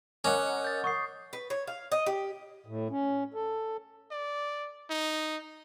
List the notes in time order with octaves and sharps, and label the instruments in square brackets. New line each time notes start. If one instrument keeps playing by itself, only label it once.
[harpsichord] C#4 [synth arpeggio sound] A#4 D#5 F#5 [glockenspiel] D6
[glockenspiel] G6 A6
C#6 D#6 C7
[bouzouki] B4
C#5
F5
D#5
G4
[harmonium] A2
C#4
A4
[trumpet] D5
D#4